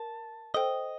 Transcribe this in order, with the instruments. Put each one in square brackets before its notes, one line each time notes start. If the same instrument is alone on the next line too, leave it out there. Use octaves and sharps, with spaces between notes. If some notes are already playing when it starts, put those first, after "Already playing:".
Already playing: [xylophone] A#4 [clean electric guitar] A5
[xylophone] A4 C5 G5 [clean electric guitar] D#5